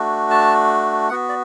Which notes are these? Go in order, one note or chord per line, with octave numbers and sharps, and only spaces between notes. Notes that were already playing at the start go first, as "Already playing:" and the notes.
Already playing: A3 D4 F#4
A5
B3 F#4 F#5
D5